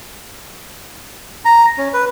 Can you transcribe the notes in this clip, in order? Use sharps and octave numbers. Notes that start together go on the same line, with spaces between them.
A#5
C#4
B4